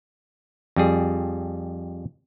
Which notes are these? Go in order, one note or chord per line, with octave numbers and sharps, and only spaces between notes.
F2 G3 G#4